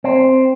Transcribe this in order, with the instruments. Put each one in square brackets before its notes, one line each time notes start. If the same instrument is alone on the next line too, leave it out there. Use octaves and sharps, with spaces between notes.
[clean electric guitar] C4